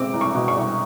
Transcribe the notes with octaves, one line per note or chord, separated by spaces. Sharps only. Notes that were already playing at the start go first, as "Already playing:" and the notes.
Already playing: B2 G#3 C4 D6
C2
C#6
B2
C#6
C2